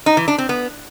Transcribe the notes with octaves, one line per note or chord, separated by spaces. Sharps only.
D#4
E3
D4
C4
B3